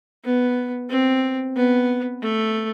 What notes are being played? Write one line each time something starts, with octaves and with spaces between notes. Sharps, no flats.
B3
C4
B3
A3